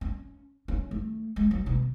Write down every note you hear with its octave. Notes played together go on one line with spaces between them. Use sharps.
C#4
C#4
A3
G#3
F#3
B2